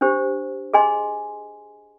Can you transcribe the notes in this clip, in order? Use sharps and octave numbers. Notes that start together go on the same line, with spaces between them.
D4 G4 C5
G#4 D#5 G#5 C6